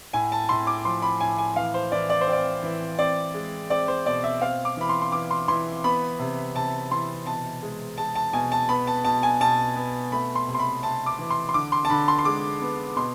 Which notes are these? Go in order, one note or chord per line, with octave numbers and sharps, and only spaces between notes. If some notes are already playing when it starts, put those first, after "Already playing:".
A2 G#5
A5
A2 C6
D6
F3 C6
B5
A2 G#5
G#5
E3 F5
C5
E3 D5
D5
C5
C4
D5
E3
C4 D5
G#3
C4 D5
C5
B2 D5
E5
C4 F5
D6
E3 B5
C6
C6
E3 D6
C6
E3 C6
B3 B5
C3
C3 A5
E3 C6
B2 A5
G#3
G#3 A5
A5
B2 G#5
A5
B3 B5
A5
B2 A5
G#5
B2 A5
B3
A3 B5
C6
C3
C6
B5
C3 A5
D6
E3
C6
C6
D3 D6
C6
A5
D3 B5
C6
C6
G#3 D6
B3
B2 C6